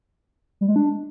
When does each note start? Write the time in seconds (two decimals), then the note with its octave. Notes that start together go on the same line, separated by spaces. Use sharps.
0.61 G3
0.68 G#3
0.76 D4